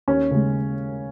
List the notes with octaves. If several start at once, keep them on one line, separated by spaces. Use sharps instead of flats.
D#2 C#4
C#3 G#3